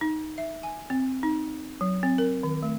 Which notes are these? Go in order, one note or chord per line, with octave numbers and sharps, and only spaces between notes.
D#4
E5
G#5
C4
D#4
F#3
C4
A#4
D#3
A3